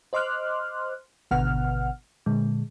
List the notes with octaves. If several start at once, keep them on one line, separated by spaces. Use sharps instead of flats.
C5 D#5 C6 D6 F6 F#6
G#1 B2 D3 B3 F#5 F6
A#2 D3 G#3